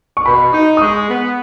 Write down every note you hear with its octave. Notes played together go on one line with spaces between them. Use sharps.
C#6
B2 B5
D#4
D#6
G#3 C#6
B3